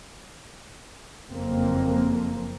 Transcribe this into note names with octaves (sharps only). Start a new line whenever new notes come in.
F#1 F2 A#3 C4